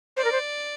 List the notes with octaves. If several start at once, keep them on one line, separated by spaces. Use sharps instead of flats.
C5 D5
A#4
C5